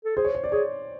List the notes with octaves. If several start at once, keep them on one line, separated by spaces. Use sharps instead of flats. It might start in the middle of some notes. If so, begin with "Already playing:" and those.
A4
G#4 C5
C#5
C#5
D5
G#4 C#5